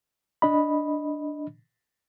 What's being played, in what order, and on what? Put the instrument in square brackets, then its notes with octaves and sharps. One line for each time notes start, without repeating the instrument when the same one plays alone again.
[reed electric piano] D4 D#5 B5